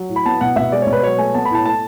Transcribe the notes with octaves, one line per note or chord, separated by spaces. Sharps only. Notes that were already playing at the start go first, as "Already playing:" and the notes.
Already playing: F#3
A2
B5
B3 A5
B2 F#5
B2 E5
G#3 D5
B2 C#5
B4
F#3 C#5
A3 G#5
B3 A5
B5
A2 A5
A3 A5